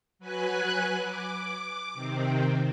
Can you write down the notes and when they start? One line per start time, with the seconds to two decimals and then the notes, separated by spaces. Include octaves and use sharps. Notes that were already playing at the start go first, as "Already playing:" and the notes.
0.19 F#3 B4 G#5 F#6
1.02 D6
1.94 C3 D#3 C4